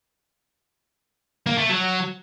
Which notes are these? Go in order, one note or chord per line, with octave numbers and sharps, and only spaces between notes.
A#3
A3
F#3